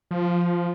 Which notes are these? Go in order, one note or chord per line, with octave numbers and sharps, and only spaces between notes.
F3